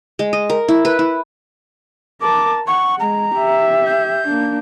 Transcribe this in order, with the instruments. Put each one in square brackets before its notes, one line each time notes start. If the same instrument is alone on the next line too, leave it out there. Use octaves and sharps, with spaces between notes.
[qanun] G#3
D#5
A#4
E4
B4
E4
[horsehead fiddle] A#4 A5 [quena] D6
[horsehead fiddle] F#5 [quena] C#6
[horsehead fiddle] G#3 [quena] A#5
[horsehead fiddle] G4 E5
[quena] G6
[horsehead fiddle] A#3 D4